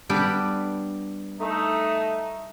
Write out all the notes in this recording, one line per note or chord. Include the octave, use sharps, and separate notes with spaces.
G3 B3 D4
A3 D#4